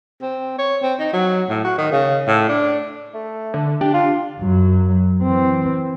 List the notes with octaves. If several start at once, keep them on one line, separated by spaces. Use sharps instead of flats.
C4
C#5
C4
D#4
F#3
A2
F#4
D#3
C#3
A2
D4
A3
D3
D4 G4
F4
F#2 F#3
E3 C4